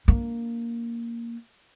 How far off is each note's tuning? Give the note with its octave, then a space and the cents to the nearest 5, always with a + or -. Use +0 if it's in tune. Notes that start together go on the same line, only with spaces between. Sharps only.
A#3 +0 D4 -20